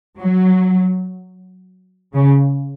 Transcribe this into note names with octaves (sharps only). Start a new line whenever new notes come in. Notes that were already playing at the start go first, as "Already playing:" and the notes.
F#3
C#3